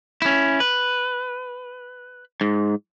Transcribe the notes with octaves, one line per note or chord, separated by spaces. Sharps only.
C#4 E4
B4
G#2